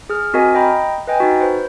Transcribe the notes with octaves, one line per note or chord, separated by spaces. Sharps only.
G#4 F6
C4 F#4 A#4 D#5 G#5
D#5 G5 A#5 B5
B4 D#5 G5 G#5
D#4 F#4
B4 C5